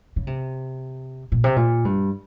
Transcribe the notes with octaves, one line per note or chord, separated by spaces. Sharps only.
C#3
C3
A#2
C3
A#2
G2